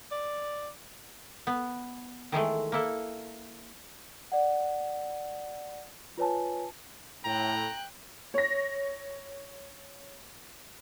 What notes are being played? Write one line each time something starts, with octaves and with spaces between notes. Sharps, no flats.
D5
B3
D#3 E3 G#3 A3
A#3 E4 A4
D5 F#5
F4 B4 C#5 G#5 A5
A2 G5 A#5 F#6
C#5 A#6